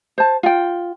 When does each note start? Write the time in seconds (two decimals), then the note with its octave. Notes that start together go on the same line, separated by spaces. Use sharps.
0.18 C5 A5
0.43 F4 G5